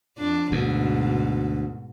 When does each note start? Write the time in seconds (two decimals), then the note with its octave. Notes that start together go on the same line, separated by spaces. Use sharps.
0.18 F2 D4
0.52 D2 G#2 B2